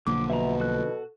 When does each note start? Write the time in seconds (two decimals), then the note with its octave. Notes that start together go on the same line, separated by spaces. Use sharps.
0.07 B1 D3 F3 A#3 D6
0.30 B2 E5 F#5 A#5
0.60 F#4 A4 F#6